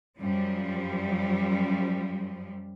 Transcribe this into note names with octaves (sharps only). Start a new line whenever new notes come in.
F#2 F3 G3